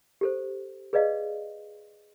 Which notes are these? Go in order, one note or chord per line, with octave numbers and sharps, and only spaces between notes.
G4 A4 C5
G#4 B4 D5 D#5 F5